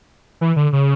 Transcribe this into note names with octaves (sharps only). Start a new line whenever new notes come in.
E3
D3
C#3